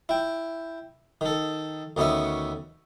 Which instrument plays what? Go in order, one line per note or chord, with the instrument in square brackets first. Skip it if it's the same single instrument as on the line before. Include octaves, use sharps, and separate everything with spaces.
[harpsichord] E4 G5
D#3 A4
D2 D#3 B3 C#4 E5 C#6